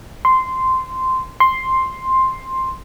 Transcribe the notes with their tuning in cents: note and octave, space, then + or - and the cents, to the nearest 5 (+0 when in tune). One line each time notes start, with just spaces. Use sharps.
C6 -10
C6 +5